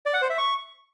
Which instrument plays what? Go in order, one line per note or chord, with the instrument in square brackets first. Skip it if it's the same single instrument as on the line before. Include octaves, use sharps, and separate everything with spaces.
[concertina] D5
F#5
C5
E5
C#6